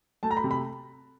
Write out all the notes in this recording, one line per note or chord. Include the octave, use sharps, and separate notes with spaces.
A3 A5
A#5
B5
C3
B5